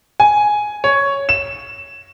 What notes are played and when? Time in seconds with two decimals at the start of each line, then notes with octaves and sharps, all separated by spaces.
0.20 G#5
0.84 C#5
1.29 E7